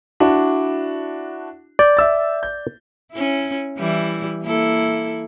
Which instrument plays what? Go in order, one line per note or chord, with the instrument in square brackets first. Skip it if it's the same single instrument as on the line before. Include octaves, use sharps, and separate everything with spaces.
[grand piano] D4 E4 F#4
[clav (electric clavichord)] D5 [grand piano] G6
[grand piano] E5 E6 A6
G6
[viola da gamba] C#4 E4
E3 G3 E4
A#3 E4 A4